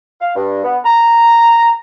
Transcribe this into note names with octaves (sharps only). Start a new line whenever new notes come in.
F5
G2
B3
A#5